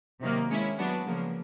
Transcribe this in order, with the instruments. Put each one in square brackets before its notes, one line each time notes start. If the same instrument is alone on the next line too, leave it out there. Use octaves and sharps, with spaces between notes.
[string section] C3 D#3 F#3 A#3
G#3 C#4 E4
F#3 B3 D4 F#4
C#3 F3 A#3